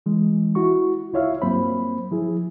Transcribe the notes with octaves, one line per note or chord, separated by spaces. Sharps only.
E3 G#3
E4 F#4 C#6
C#2 E4 F4 C#5 E5 F5
G2 F#3 A#3 C4 C5 B5
F3 E4 G#4